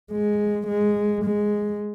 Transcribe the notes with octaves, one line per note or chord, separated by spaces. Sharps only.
G#3
G#3
G#3